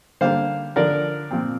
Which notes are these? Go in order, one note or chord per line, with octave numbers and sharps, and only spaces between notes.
D3 G3 A#3 D4 C5 F5
D3 F3 D4 A#4 D5
A#2 F3 C4